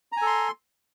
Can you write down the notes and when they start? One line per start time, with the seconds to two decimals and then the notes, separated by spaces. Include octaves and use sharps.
0.12 A#5
0.17 G#5
0.22 A4
0.27 C6